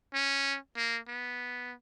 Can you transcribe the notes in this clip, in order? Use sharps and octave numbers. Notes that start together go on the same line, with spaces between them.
C#4
A#3
B3